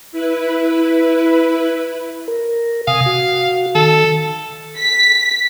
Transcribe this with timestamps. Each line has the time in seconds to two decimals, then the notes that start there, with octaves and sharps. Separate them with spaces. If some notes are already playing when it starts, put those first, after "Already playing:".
0.12 E4 B4
2.28 A#4
2.88 C3 F5 G#5 D#6
3.06 F#4
3.75 D#3 A4
4.77 B6